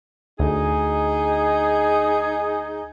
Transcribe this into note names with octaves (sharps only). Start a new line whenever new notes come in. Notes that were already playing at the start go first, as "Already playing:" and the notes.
D2 D#4 G#4